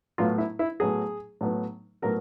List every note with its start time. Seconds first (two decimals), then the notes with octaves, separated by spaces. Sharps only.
0.18 A2 F#3 B3 F4
0.38 E4
0.59 E4
0.80 A2 F#3 B3 G#4
1.41 A2 F#3 B3
2.02 A2 F#3 B3 A#4